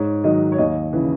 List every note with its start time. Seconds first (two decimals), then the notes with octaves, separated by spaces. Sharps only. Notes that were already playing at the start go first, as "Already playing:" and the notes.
Already playing: G#2 C#5
0.24 D#3 F#3 D#5
0.52 C#5
0.58 D#2 D#5
0.93 C#3 E3